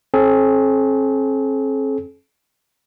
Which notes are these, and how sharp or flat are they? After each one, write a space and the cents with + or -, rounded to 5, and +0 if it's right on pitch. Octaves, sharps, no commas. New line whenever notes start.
C4 +45 A4 -45